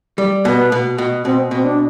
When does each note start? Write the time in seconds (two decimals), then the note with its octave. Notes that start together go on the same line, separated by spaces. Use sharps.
0.18 G3
0.45 B2 B3
0.72 B2
0.98 B2
1.25 B2 C4
1.51 B2 C4
1.64 D4